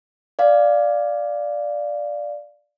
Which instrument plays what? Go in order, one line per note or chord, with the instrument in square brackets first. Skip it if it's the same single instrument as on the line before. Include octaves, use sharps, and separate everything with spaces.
[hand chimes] D5 F5